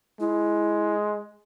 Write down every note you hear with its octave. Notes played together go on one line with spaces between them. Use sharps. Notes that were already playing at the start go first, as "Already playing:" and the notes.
G#3 E4